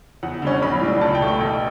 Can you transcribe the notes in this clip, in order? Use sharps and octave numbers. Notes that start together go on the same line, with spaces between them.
E2 F#5
D3 G3 C#4
B1 B5
A2 G3 D4
C#2 A5
G5
B2 A3
G5
A1